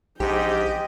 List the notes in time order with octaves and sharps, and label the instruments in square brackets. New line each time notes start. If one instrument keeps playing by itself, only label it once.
[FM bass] A#1 [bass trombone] G#2 [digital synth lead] G4 [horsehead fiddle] D#5 G5